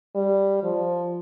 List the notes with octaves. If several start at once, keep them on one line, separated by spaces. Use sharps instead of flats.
G3
F3